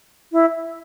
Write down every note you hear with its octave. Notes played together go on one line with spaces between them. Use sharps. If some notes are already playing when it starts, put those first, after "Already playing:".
E4